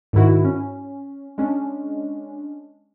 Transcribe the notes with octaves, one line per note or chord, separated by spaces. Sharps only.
G#2 D#3 E4 F#4
C#4
G#3 C#4 D4